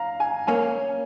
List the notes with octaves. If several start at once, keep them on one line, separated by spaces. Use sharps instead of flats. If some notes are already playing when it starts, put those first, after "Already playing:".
Already playing: F5 A#5
G#5
A#3 C#4 G#5